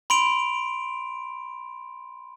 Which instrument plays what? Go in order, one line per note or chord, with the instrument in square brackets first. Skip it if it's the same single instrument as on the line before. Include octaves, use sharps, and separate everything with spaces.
[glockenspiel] B5 C6 D7 F7